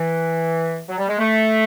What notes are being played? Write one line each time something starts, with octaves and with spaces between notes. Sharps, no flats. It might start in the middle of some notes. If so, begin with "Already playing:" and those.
Already playing: E3
F#3
G3
G#3
A3